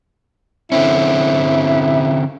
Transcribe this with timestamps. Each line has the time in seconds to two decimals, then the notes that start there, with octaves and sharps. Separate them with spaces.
0.72 D3 C4 C#4 E4